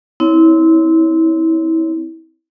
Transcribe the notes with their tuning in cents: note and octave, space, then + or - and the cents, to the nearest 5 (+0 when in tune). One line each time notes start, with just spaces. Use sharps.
C4 -15 E4 -30 C#5 +10